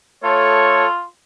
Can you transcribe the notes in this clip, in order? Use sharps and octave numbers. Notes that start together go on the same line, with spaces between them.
A3 F4 A4 C#5